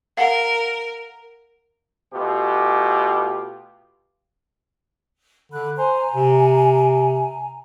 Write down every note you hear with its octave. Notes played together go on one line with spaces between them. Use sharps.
A#4 F5 F#5
B2 A3 F4 G4
D3 B5 F#6
C5 G#5 A#5
C3